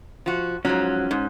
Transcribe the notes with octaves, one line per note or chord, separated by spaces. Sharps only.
F3 F#4
G#2 F3 F#3 C#4
G#2